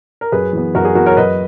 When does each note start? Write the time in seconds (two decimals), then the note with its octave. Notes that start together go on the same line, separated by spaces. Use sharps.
0.21 A#4
0.32 F#2 G#4 B4
0.53 E3 B3
0.75 F#2 F#4 A#4
0.85 G#4
0.95 E3 B3 F#4 A#4
1.06 A#4 C#5
1.17 F#2 B4 D#5